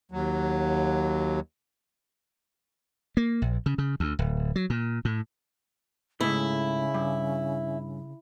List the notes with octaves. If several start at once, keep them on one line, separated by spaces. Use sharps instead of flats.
D#2 F#3
A#3
A#1
C#3
C#3
D2
D1
F#3
A#2
A2
G#2 C#3 A3 E4
G2